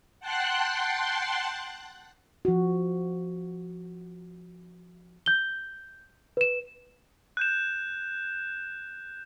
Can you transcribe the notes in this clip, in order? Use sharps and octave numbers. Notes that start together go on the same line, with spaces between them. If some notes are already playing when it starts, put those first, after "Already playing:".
F#5 G5 A5 C6 F#6
F3 F#4
G6 G7
B4 E7
F#6 G6 E7